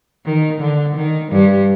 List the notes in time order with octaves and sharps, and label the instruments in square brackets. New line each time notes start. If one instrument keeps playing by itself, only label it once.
[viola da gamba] D#3
D3
D#3
G2 G3